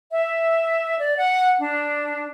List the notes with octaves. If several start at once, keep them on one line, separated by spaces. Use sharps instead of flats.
E5
D5
F#5
D4